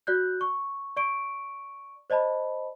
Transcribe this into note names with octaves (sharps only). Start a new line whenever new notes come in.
F#4 D5 F#6 G6
C#6
D5 C#6 D7
C5 D5 D#5 A5 B5